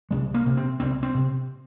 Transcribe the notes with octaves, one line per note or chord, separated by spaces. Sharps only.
C2 G#3
A#3
C3
C4
C2 C4
C4
C3